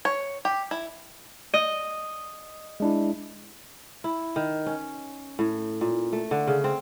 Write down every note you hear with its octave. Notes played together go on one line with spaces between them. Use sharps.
C#5
G4
E4
D#5
G#3 D4 E4
E4
D#3
C#4
A2
A#2
A3
D3
C#3
C4